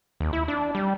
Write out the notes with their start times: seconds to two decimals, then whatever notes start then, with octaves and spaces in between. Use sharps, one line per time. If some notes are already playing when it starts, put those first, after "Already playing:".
0.20 D#2
0.33 E4
0.48 D4
0.75 G3